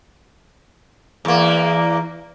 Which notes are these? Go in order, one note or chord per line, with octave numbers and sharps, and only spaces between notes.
E2 A#3